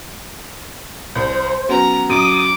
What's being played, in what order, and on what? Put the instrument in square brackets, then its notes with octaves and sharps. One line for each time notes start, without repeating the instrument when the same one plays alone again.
[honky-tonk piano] C2 [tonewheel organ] C5
[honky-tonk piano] F#3 B3 C#4 [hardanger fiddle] A#5
[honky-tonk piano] F#2 F#3 [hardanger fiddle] D6 [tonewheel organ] D#6